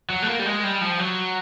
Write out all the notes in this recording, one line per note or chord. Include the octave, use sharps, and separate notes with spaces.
F#3
A3
A#3
G3
G#3
G3
F3
F#3